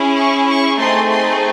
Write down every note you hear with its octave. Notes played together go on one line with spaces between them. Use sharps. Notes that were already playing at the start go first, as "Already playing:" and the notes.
Already playing: C#4 E4 G#4
C#6
C#6
A3 C4 D#4 G#4 C6
C6